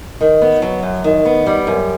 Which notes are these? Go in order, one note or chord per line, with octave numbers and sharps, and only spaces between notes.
D#3
B3
F#3
F#2
D#3
B3
G3
F#2